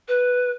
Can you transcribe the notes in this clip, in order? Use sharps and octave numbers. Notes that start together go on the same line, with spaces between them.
B4